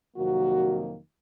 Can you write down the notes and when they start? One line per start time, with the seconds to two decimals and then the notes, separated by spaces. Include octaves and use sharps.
0.15 F2 C3 D#3 F#3 A#3 F#4